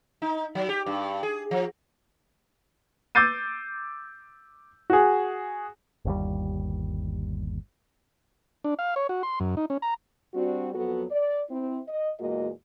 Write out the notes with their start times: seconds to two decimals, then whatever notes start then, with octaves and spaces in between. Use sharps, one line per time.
0.22 D#4
0.55 F#3
0.69 G4
0.86 G2
1.23 G#4
1.51 F3
3.15 D6 E6 G6 A6 C7 D#7
4.90 F#4 G#4
6.05 G1 D#2 G3
8.64 D4
8.79 F5
8.96 C#5
9.09 F#4
9.23 C6
9.40 F#2
9.57 D#4
9.70 C#4
9.82 A#5
10.34 G3 C4 D4 F#4
10.74 F2 F#3 B3 F#4 A4
11.11 D5
11.51 C4 E4
11.88 D#5
12.20 E2 A#2 G#3 A#3 F#4 D#5